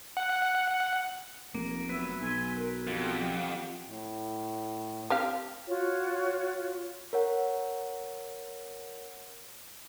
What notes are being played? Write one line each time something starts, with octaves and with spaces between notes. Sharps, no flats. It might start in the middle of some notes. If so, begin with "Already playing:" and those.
F#5
F1 A#3
F#3 B3 B4 E5
B1 G#5 C6
A#4
F2 G4 F#5
A2
C4 G4 F5
F4 F#4 C#5
A#4 C#5 F#5